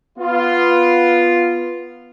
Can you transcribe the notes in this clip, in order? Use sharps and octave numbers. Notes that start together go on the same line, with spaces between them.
B3 F4